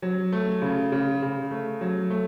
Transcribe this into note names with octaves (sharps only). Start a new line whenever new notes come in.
F#3
A3
C#3
C#3
C#3
A3
F#3
A3